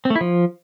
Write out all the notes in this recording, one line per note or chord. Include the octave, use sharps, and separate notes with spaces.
C4
A3
E4
F3